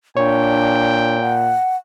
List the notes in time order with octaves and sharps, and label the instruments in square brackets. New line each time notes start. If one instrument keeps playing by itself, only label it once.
[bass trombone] A#2 [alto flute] D4 [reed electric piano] C#5 [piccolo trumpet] G5
[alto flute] F#5